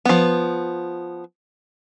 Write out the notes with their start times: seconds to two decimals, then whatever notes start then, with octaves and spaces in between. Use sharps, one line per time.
0.05 F3 B3